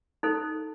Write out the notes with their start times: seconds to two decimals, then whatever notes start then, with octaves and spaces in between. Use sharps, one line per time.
0.23 D#4 A4 C5